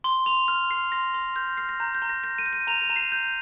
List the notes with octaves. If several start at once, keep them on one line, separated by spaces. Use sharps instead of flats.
C6 G7
C6 F7
F6
F6 C7
C6 A#6
C6 A#6
F6 G6
A#6
F6 C7
A#6
A#5 G6
G6
A#5
A#6
G6 A#6
D#7
G6
D#7
A#5 F7
D#7
A#5
C7
G6